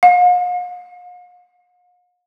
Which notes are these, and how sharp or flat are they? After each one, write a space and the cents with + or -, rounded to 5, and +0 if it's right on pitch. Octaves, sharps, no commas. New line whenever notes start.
F5 +45